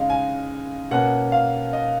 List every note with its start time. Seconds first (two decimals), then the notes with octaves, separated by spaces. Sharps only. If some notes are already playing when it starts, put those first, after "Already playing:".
Already playing: C#3 G#3 D#4 F5
0.10 G#5
0.91 B2 A#3 C#4 F#5
1.32 F5
1.73 D#5